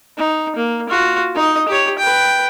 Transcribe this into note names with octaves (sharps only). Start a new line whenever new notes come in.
D#4
A#3
F4 F#4
D#4 D#5
G4 C#5
B4 G5